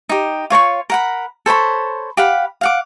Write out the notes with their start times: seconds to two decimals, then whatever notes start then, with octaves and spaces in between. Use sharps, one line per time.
0.09 D#4 G4
0.50 F4 C#5 A#5 C#6
0.90 A#4 F#5 B5
1.46 A4 C5 C#5 B5
2.17 G4 F5 F#5 B5
2.61 F5 F#5 D6